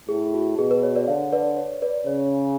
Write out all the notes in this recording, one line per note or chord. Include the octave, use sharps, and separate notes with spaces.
A2 G#4
F#4
B2 G#4
B4
C#5
B4 D5
D3 C#5 F5
B4 D5
C#5
B4 D5
C#3 C#5